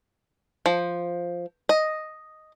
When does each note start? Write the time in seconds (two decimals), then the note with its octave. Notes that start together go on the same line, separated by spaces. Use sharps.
0.66 F3
1.69 D#5